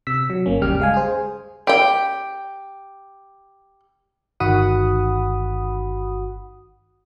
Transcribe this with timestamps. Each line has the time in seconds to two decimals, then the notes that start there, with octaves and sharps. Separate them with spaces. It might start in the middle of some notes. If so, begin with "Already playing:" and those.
0.07 C3 E6 B6
0.30 F#3
0.46 G1 A#3 C#4
0.61 G1 D#2 C#3 G3 G4 F6
0.80 G#3 F5 G#5
0.94 G#4 C5
1.67 G4 G5
4.40 G1 D#3 F#4 F#5 B5 D#6